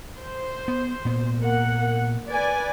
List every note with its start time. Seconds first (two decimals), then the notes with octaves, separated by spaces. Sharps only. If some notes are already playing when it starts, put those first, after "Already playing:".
0.19 C5
0.68 B3
1.05 A#2 B3
1.39 A#3 F#5
2.27 B4 D5 G#5